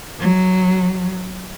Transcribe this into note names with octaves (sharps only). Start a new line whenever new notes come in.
F#3